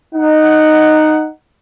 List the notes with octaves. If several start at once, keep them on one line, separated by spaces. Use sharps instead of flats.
D#4 F#5